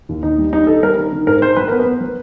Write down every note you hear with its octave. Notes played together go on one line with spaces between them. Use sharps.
D#2
D#2 D#4
G3
G3 D#4
D#3 A4
G3 A#4
D#3
D#3
G#2 A#4
D#3 C5
F#3 B4
B3 A#4
B4
B3
F#3